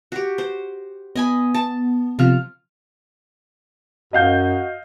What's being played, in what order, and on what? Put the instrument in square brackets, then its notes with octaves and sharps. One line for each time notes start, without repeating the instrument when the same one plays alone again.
[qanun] F#4 G4
C5
[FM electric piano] B3 [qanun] D#5 G#5 B5
[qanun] A5
[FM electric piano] C3 F3 F6 [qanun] F4
[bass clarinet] F#2 [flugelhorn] F#4 [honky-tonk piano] D#5 F5 G6